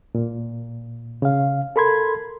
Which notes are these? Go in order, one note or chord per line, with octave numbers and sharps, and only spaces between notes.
A#2
C#3 F5
A4 A#4 B5 C6 G#6